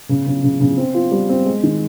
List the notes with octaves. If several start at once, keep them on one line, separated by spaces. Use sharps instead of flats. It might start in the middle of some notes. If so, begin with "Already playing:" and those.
C#3
C#3
C#3
C#3
C4
F4
G3
C4
G#3
D#3